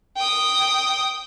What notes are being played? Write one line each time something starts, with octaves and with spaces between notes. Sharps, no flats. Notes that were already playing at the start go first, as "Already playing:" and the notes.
G5 D#6